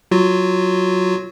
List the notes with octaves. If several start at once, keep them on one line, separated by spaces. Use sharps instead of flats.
F#3 F4 F#4